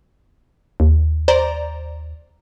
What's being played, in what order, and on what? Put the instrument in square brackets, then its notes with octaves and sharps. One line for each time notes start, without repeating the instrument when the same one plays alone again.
[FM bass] D#2
[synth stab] C5 D5 A#5